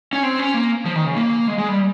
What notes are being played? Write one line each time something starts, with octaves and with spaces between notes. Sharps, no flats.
C#4
C4
C#4
A#3
F3
D#3
C#3
A#3
G#3
G#3
G3